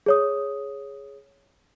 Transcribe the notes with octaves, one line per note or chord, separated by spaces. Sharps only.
G#4 C#5 D#6